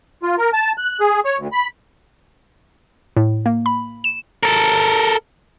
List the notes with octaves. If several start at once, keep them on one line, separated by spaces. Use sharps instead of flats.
F4
A#4
A5
F#6
G#4
C#5
D2
B5
A2
A#3
B5
E7
A4 A#4